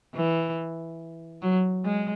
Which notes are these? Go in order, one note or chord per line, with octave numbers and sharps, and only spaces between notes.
E3
F#3
G#3